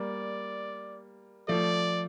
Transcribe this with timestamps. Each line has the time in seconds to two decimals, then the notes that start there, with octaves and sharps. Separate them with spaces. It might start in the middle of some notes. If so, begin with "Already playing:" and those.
Already playing: G3 A#3 D5
1.48 F3 A3 D5